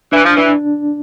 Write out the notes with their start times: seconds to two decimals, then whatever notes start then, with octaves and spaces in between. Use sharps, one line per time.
0.12 E3 D4
0.24 F3
0.36 E3 D4